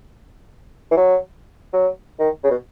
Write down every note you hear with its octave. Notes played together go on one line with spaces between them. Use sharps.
E3
F#3
F#3
D#3
C#3
B2